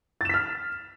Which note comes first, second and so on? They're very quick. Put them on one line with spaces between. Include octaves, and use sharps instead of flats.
A6 E7 B6 F6